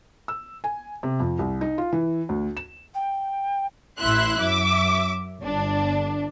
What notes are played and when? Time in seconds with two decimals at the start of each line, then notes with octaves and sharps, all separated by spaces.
0.28 E6
0.64 G#5
1.03 C3
1.20 F2
1.39 C2
1.61 D#4
1.78 F4
1.92 E3
2.29 D2
2.57 E7
2.94 G5
3.98 A1 E4 E5 C6 F#6
4.40 F#2 E5 D6
5.42 G1 D4